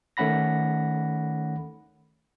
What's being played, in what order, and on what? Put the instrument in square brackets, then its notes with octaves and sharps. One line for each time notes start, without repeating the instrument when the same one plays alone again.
[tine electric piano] D#3 A3 C#4 F#5 B5 A#6